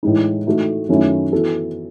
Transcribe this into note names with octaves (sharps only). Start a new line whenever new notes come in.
A2 E3 G#3 D#4
E3 A3 D#4 F#4 A4
F#2 D#3 A3 C#4 E4
E3 B3 F#4 A4